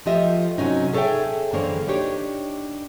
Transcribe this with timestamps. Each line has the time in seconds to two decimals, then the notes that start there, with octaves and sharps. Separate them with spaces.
0.06 F3 A3 F4 G4 D#5 E5
0.58 C3 F#3 C#4 D#4
0.94 G#4 A4 C#5 D5 E5 G5
1.52 F#2 D3 E3 A#3 C5 C#5
1.88 D4 D#4 G4 C#5